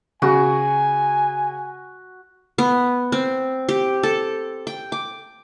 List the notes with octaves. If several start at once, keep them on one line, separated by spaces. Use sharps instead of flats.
C#3 F#4 G#5
B3
C4
G4
A4
G5
D6